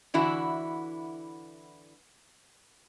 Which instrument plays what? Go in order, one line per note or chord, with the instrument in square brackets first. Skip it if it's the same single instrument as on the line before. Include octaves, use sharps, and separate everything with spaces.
[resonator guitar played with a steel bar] D3 E3 E4 F#4